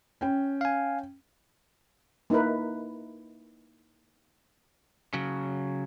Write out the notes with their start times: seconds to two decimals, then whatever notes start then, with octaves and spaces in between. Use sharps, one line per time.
0.21 C#4 G5
0.61 F5 G#5
2.30 A#3 D#4 E4 A#4 B4
5.14 C#3 F#3